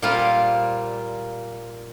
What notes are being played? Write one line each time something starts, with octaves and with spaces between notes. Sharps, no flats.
A#2 G3 A#3 F4 C5